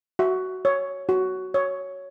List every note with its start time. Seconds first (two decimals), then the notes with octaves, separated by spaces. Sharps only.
0.19 F#4 E5
0.65 C#5
1.09 F#4
1.54 C#5